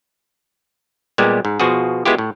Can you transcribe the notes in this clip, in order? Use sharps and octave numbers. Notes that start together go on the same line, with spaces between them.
A#2 G3 G#3 B3 G4
G#2
B2 F3 F4 F#4 G#4
G#3 B3 E4 F4 G4
A2